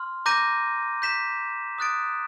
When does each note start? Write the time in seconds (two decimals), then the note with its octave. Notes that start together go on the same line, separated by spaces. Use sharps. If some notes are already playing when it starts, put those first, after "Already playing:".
Already playing: C6 F6
0.26 A#5 D6 G6 A#6 D#7
1.02 G6 B6 E7
1.78 D#6 F#6 A6 D7